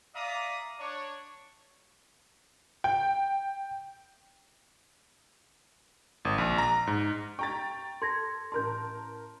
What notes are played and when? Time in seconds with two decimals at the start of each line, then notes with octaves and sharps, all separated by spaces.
0.15 D5 E5 F5 A#5 D6 D#6
0.79 D4 C#5
2.84 G5
6.25 G#1
6.38 A#1
6.58 A#5
6.87 G#2
7.39 G5 A#5 C#6 A6
8.02 A4 C6 G#6 A#6
8.52 A1 A#4 A5 C6 G6